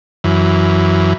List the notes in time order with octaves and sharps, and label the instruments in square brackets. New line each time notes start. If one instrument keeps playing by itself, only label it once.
[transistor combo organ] F#2 E3